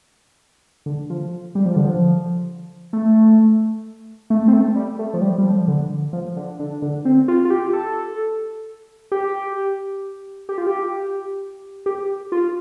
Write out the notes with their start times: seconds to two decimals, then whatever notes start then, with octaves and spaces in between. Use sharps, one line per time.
0.86 D3
1.10 F3
1.55 G3
1.66 F3
1.76 D3
1.85 F3
2.93 A3
4.30 A3
4.48 C4
4.53 A3
4.76 G3
4.99 A3
5.14 F3
5.21 G3
5.38 G3
5.45 F3
5.68 D3
6.13 F3
6.36 D3
6.59 D3
6.82 D3
7.05 C4
7.28 F4
7.45 F4
7.51 G4
7.73 A4
9.12 G4
10.49 G4
10.58 F4
10.67 G4
11.86 G4
12.32 F4